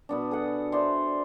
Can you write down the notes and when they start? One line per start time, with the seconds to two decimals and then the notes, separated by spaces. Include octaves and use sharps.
0.09 B2 B3 D4
0.31 G#4 A4 F#5
0.72 C5 D5 E5 C6